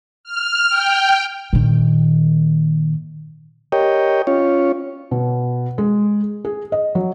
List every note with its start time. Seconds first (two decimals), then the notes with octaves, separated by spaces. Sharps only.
0.24 F6
0.69 G5
1.53 A#2 D#3
3.72 G4 A#4 C#5 D#5 G5
4.27 C#4 F4 C#5
5.11 B2
5.78 G#3
6.45 G#4
6.72 D#5
6.95 F#3